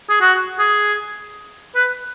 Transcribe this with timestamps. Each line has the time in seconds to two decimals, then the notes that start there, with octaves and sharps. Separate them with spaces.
0.09 G#4
0.21 F#4
0.59 G#4
1.75 B4